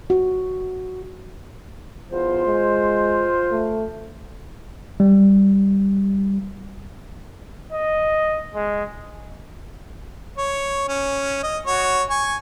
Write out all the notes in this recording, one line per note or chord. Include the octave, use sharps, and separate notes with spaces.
F#4
E2 F4 C5
G#3
A3
G3
D#5
G#3
C#5
C#4
D#5
F#4 C#5
G#5 C#6